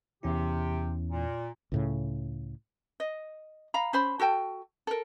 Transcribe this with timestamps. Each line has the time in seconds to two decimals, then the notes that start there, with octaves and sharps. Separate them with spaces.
0.23 E2 C3 C#4 E4 G4
1.10 A#2
1.72 C#2 A2 C#3
3.00 D#5
3.74 F5 A#5 B5
3.93 C#4 C5 B5
4.20 F#4 A4 G5 A5
4.87 A4 A#4